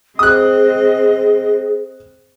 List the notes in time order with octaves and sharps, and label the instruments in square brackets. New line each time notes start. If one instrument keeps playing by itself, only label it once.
[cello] C4 D#5 [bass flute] G#4 [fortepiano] D#6 F#6